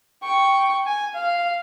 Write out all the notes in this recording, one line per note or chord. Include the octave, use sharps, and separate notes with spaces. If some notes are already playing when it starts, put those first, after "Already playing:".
G5 C#6
G#5
F5